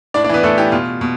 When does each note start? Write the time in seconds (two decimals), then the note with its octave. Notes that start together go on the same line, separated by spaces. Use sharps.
0.14 A2 D4 D5
0.24 D4 D5
0.29 E3 B3 B4
0.43 A2 A3 A4
0.58 E3 G4
0.72 B2 F4
1.01 B2